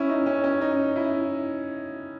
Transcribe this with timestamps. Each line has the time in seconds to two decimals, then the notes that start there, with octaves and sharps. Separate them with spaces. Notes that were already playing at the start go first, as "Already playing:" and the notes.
Already playing: C#4 E4
0.09 D#4
0.26 C#4
0.44 C#4
0.61 D#4
0.96 E4